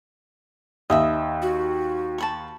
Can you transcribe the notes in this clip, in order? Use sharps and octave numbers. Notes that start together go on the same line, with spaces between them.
D#2 D#5 E5 B5
F#4
A5 B5 C#6